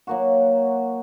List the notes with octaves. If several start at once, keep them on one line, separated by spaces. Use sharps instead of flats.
F#3 A#3 F#4